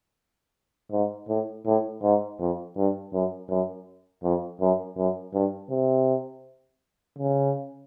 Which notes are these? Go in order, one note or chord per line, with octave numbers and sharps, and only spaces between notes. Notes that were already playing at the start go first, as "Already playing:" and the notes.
G#2
A2
A2
G#2
F2
G2
F#2
F#2
F2
F#2
F#2
G2
C3
C#3